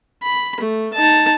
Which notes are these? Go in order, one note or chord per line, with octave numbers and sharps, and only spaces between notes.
B5
A3
D#4 A5